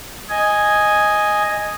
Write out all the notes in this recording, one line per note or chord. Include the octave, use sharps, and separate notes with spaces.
D#5 G#5